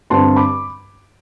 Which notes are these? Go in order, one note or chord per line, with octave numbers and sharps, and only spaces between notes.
G2 D3 G3 C4 A5 C6
B5 D6